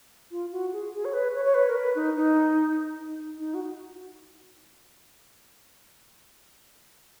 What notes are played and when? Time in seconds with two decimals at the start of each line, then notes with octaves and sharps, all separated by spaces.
0.31 F4
0.52 F#4
0.73 G#4
0.94 G#4
1.05 C#5
1.13 B4
1.35 C#5
1.45 C#5
1.54 B4
1.69 A#4
1.76 B4
1.95 D#4
2.16 D#4
2.99 D#4
3.39 D#4
3.54 F#4